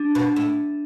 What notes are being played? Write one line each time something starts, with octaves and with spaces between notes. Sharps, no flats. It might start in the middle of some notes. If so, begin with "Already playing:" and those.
Already playing: D4
B2
A2